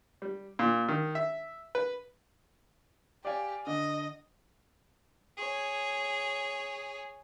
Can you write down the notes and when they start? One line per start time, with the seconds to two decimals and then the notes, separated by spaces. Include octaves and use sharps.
0.22 G3
0.59 A#2
0.88 D#3
1.15 E5
1.75 B4
3.25 G4 D5 F5 G#5
3.67 D3 D#5
5.37 G#4 C#5